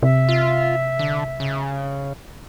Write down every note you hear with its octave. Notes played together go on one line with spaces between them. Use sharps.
C3 E5
F4
D3
C#3